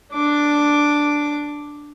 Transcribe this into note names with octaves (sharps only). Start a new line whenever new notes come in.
D4 D6